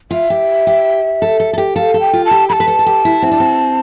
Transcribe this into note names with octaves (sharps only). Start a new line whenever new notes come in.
F4 E5
G4
G4
A4
A4
A4
G4
A4 F5
A4
G5
F4
A5
G4
A4 A5 B5
B4
A4
A4
G4
E4
C4
D4
C4